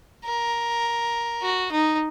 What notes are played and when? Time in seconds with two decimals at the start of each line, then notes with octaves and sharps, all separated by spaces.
0.24 A#4
1.42 F#4
1.72 D#4